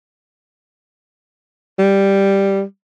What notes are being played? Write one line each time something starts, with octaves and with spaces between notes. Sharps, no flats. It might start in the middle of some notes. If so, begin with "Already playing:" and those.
G3